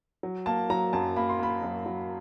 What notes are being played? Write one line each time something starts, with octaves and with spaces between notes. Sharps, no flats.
F#3
A#3 A5
F#3 A#5
F#2 A5
A#3 B5
C6
A#3 B5
F#2
F#3